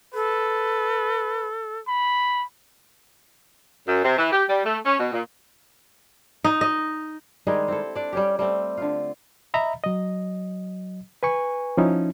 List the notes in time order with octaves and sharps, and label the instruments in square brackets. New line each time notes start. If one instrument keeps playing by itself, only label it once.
[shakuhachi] A4 [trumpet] B4
[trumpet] B5
[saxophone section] F#2
C3
E3
G4
G3
A3
C#4
B2
A#2
[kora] D#4
D#5
D#3 G3 G#3 G#4
C4 E4 A4
D4 D5
G3 C#4 G4
G3 A3 C4
D3 F4
[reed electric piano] D#5 E5 A#5 B5
F#3 D#5
B4 G#5 C#6
F3 C#4 D#4 E4